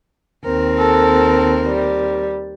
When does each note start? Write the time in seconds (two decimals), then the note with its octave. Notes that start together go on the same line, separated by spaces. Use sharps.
0.45 D#2 C4 A#4
0.78 A4
1.67 G3